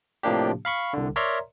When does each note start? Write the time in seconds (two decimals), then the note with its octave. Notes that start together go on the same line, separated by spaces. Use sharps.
0.23 A2 C3 F3 A#3 D4 G4
0.65 F5 B5 C#6
0.93 C2 D3
1.16 A#4 C#5 D5 E5 A#5 C6